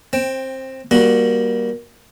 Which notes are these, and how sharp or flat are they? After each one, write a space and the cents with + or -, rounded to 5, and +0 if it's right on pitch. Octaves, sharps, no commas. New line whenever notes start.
C4 +15 G5 +0
G3 +0 A#3 +20 F#4 +0